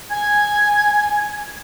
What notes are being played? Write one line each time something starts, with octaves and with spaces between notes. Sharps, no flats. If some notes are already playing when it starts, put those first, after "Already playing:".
G#5 G#6